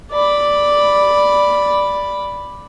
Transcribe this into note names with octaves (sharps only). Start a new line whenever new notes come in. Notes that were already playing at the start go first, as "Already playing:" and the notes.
D5 B5